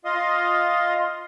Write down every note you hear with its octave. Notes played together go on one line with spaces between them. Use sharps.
F4 D#5 F5 C6 D#6